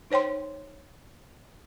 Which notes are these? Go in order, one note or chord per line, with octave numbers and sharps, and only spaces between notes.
D#4 C5 C#5 G5 C6